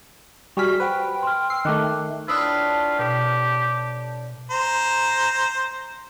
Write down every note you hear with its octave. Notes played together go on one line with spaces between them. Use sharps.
G3 F#4 G#4 C#6 F6 B6
B4 C5 F#5 G5
C6 F6
E6 F6 C7
D#3 A3 D6 F#6
A2 D4 F4 B4 D#6 E6
B2 G4
C5 A#5